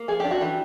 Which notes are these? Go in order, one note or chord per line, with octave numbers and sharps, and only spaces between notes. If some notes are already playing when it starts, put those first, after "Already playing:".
Already playing: A#3
F3 G#4
D4 G4
F#4
E3 G4